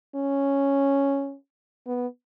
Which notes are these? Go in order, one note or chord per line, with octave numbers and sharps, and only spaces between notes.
C#4
B3